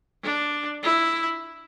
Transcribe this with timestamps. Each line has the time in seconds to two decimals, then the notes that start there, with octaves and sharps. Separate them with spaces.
0.23 D4
0.83 E4